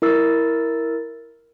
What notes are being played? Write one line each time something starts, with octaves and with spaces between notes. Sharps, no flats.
E4 A#4 E6 A6